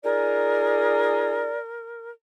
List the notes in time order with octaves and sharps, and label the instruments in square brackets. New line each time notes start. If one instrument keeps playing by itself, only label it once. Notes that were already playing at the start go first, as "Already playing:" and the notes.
[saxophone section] D#4 F4 G#4 [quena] A#4 [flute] D5